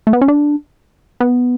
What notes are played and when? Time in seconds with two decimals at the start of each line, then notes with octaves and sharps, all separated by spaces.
0.07 A3
0.13 B3
0.21 C#4
0.28 D4
1.20 B3